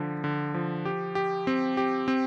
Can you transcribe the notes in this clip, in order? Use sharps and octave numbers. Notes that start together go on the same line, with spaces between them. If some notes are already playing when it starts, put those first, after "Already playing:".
Already playing: D3 F3
D3
F3
G4
G4
C4
G4
C4